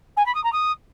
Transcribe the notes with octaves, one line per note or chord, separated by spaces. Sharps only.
G#5
B5
D#6
A#5
D#6